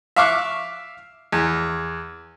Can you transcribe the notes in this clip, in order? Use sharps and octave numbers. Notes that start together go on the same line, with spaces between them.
E5 F5 C#6 D6 F6 F#6
E2